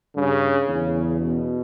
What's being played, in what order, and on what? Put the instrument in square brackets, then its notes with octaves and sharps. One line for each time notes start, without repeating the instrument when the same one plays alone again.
[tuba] G2 [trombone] C#3
[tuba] E2 [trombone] C#3
[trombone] B2